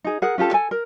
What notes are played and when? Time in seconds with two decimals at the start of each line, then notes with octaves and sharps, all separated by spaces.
0.04 D#4 G#4
0.22 G#4 A#4 F#5
0.38 C#4 F4 G4 A4
0.53 A4 G#5
0.71 A#4